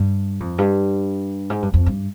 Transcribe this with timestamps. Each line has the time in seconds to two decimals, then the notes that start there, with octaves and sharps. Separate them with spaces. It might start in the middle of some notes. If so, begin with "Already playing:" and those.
Already playing: G2
0.40 F2
0.58 G2
1.50 G#2
1.62 G2
1.74 F2
1.86 G2